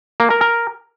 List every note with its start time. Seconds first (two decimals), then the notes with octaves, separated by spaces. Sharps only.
0.20 A#3
0.30 A#4
0.41 A#4